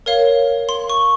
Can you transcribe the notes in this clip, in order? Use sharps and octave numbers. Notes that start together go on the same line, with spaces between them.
A#4 C#5 F5
C6
C#6